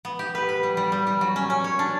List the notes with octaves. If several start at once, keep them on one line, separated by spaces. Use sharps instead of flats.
B3
G4
B4
B4
G3
G3
G3
G3
F#3
C#4
C#4
C#5
D4